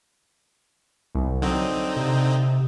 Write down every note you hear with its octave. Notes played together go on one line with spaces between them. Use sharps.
C2
D3 F#3 C4 D#4
C3